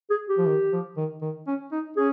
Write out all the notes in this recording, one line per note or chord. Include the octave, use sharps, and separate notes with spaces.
G#4
G4
F3
D#3
F3
D#3
D#3
C#4
D#4
C#4 G#4